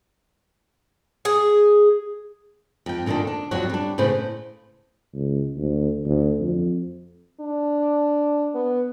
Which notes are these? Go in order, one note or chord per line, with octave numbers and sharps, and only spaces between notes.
G#4
F2 G5
A#2 D3 D#3 A3 D4
D4
F2 D3 F#3 F#4
G3 D4
A2 C#3 B4 C5
C#2
D2
D2
F2
D4
B3